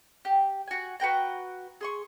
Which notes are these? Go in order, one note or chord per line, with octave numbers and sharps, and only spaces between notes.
G4
F#4 G#5
F#4 B4 G5 A#5
G#4 C6 C#6